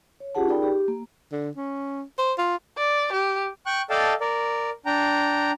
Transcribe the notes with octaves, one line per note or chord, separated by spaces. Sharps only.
C#5
C#4 F4 G4 G#4 F#5 A5
D#4 G#4 A#4 D5 G5 B5
G4
A#3
D3
C#4
C5
F4
D5
G4
G5 C#6 F#6
A4 D5 D#5 F5 G5 A5
A#4 D5
D4 G5 A#5